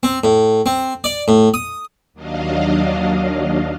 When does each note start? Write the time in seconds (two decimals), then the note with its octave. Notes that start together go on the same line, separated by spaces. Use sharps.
0.03 C4
0.24 A2
0.66 C4
1.04 D5
1.28 A2
1.54 D#6
2.14 D#2 F#3 D4 D#5 F5